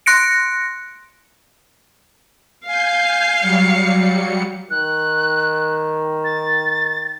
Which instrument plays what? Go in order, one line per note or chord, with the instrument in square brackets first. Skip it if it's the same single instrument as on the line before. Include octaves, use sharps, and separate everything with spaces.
[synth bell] C6 F#6 A#6 C#7 D7
[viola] F5 [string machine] G#5 G6 C7
[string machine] F#3 G3 C#7
[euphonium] D#3 [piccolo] F#6
[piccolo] A6